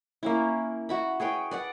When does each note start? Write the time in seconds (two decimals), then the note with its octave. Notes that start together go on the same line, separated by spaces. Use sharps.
0.23 A#3 C#4 E4
0.89 F#4 E5 B5
1.20 G#4 B4 C#5 G5
1.51 B4 D5 F#5